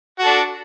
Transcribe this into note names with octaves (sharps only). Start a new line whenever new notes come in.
D4 F#4 A4